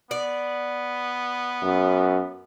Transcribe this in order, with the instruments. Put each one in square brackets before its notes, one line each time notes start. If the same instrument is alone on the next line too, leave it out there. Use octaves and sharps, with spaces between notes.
[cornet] B3 [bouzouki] D5
[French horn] F#2